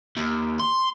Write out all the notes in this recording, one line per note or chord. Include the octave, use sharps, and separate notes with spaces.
D#2
C6